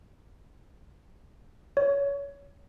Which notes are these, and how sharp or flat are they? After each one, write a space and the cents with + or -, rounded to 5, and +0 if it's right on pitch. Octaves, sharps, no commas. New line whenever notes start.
C#5 +25